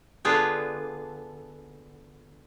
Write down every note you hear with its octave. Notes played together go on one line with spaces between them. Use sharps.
D3 B3 F4 G#4 G5